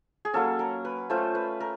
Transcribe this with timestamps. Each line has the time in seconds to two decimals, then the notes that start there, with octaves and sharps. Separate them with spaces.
0.25 G#4
0.33 F#3 A#3 C#4 A4
0.59 A#4
0.85 B4
1.10 A3 C#4 F4 C5
1.35 B4
1.60 A#4